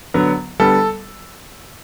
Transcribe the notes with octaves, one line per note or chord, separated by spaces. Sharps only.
D3 F#3 B3
D3 G3 B3 A4